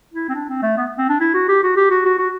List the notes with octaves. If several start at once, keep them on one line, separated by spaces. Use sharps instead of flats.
E4
C4
D4
C4
A3
B3
C4
D4
E4
F#4
G4
F#4
G4
F#4
F#4
F#4